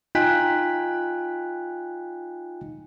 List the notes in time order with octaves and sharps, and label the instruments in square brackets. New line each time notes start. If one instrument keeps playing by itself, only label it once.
[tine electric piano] D#4 F4 G5 G#5 F#6 B6